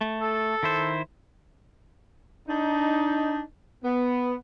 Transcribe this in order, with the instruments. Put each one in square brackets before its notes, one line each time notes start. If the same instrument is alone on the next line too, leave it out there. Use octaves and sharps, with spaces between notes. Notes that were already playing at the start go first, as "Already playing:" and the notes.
[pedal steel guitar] A3
[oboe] A4
[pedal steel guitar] D#3 E4 C5
[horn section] D4 D#4
B3